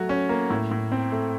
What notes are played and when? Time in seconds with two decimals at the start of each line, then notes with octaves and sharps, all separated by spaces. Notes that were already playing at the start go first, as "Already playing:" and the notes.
Already playing: F#3 A3 F#4
0.09 C#4
0.29 A#3
0.50 A2
0.71 A2
0.92 C4
1.12 A3